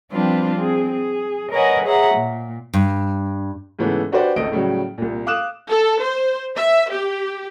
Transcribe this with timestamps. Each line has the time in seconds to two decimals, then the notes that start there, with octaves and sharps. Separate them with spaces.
0.12 F3 G3 C4 D4 F4 B4
0.56 C4 G#4
0.92 G#4
1.52 A#4 B4 C#5 D#5 F#5 G#5
1.85 G#4 C#5 E5 F#5 A#5
2.16 A#2
2.74 G2
3.79 G#2 C#3 E3 A3 B3
4.12 D4 F#4 G4 B4 C5 D5
4.36 G#1 C#2 A3 D#5 D7
4.52 A2 C#3 F#3 G3
4.98 C2 A#2
5.26 F5 D6 D#6 F#6 E7
5.70 A4
6.02 C5
6.57 E5
6.91 G4